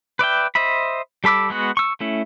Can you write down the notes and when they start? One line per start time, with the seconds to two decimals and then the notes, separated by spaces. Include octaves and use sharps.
0.19 B4 D5 E5 G5
0.55 C5 D#5 E5 B5
1.24 G3 A4 B5 D6 E6
1.50 G#3 B3 F#4
1.77 C#6 E6
2.01 A3 C#4 E4